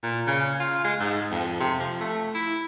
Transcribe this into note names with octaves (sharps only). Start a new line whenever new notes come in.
A#2
C#3
F4
G#3
G#2
F2
C3
F3
A3
E4